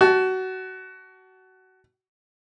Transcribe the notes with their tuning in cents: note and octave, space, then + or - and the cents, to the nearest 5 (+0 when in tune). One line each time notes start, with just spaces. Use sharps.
F#4 +20 A5 -10